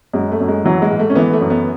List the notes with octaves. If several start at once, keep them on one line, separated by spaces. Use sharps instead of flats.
F#2 G#3
A3
F#2
G#3
E3 F#3
G#3
G#2
A3
C#4
E3 B3
A3
F#2
B3